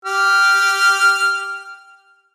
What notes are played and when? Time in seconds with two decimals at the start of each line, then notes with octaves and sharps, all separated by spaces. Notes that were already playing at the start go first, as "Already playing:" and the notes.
0.05 G4 F6